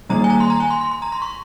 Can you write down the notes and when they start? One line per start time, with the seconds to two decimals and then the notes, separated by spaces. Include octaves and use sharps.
0.09 D#3 G3 A#3 D#4 A#5
0.24 G#5
0.30 A#5
0.40 C6
0.50 A#5
0.60 G#5
0.70 C6
0.81 C6
0.91 C6
1.02 A#5
1.12 C6
1.22 C#6